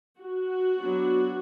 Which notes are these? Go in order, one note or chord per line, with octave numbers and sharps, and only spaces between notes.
F#4
F#3 B3 D4